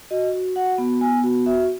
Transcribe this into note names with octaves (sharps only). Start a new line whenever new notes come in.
F#4 D#5
F#4
F#4 F#5
B3
B3 G#5
F#4
F#4 E5